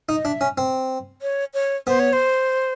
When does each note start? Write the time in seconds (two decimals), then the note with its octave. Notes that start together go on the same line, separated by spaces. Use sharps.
0.09 D#4
0.14 D#5
0.25 D4 E5
0.41 C#4
0.58 C4
1.22 C#5
1.54 C#5
1.87 B3 C5
1.99 C#5
2.13 C5